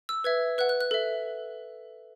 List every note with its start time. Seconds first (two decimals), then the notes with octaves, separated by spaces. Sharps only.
0.09 E6
0.24 B4 E5 G#6
0.58 B4 F#5 F#6
0.69 F#6
0.81 F#6
0.91 A4 E5